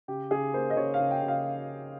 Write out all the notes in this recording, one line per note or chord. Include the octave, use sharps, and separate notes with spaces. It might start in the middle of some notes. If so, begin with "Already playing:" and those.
C#3 G4
C#3 G#4
A#3 C5
D#5
C#3 C#5
F5
C#3
G5
C#3
F5